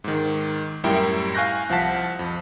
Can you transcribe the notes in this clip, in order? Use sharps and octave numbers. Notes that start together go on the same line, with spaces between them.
G#2 D#3
F#2 A2 G3 E4 A#4 G5
F5 G#5 C#6 F#6 G6 A#6
C2 F3 F5 F#5 A5 B6
F2